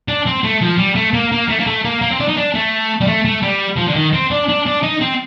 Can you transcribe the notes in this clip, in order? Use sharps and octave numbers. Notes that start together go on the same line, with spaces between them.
D4
C4
A3
F3
G3
A3
A#3
A#3
A3
A#3
A3
A#3
A#3
C4
D4
D#4
D4
A3
G3
A3
A3
G3
F3
D3
D#3
C4
D4
D4
D4
D#4
C4